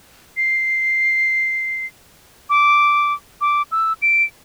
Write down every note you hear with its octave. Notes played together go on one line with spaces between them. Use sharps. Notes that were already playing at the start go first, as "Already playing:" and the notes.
C7
D6
D6
E6
D7